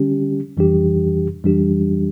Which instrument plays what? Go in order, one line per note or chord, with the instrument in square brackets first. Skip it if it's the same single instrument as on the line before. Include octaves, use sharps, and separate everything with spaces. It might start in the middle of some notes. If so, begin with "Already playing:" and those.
Already playing: [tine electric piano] D3 G3 C#4 G4
F2 E3 G3 D4 G4
F2 E3 G3 D4 G4